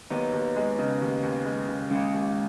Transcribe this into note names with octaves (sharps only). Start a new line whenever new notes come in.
D#2 B3 D#4
D#2
G#3
C#3
D#2
D#2
G#3
C#3
D#2 G#3 C#4
D#2